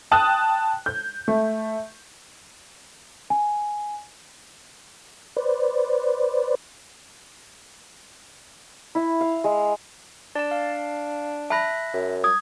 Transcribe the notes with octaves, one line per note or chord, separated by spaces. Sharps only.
G5 A5 D#6 F#6
G6
A3
G#5
B4 C5 D5
E4
F5
G#3
D4 D5 A5
F5
E5 A5 B5 F#6 A#6
F#2
D#6 G#6